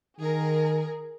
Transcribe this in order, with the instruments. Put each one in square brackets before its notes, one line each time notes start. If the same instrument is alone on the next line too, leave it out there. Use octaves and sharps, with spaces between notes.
[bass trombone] D#3 [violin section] G#4 A#4